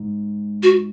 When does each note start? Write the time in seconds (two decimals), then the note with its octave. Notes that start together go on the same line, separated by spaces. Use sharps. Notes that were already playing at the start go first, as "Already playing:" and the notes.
Already playing: G#2
0.63 F#4